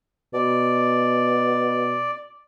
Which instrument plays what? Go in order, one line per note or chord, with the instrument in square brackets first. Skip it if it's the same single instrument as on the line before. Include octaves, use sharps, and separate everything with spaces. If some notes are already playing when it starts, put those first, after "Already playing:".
[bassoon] B2 [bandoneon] D5